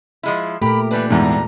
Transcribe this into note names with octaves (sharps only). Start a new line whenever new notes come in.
F3 G#3 E4
A#2 A3 G4 A#4 B5
E3 G3 D4 B4
E2 G#2 A#5